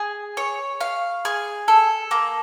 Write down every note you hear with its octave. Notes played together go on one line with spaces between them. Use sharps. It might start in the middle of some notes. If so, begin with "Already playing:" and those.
Already playing: G#4
C#5
F5
G#4
A4
A#3